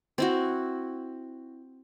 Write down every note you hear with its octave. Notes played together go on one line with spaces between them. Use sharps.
C4 E4 F#4